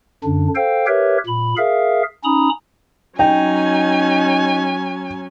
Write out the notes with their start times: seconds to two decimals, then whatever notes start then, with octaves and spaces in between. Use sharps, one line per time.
0.24 F#2 D3 D4
0.55 A4 C5 F5 G5
0.87 G4 A#4 B4 C#5 E5
1.27 A#2 B5
1.57 G#4 A#4 E5 F5
2.24 C#4 D#4 A#5 B5 D#6
3.19 F#3 C#4 D#4 G5 G#5